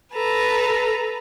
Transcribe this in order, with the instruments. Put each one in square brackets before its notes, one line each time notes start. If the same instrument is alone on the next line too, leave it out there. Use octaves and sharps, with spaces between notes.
[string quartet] A4 B4 A#5